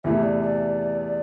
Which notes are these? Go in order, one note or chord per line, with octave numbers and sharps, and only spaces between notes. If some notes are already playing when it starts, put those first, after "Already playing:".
E2 C3 E3 A3 E5
D5
D5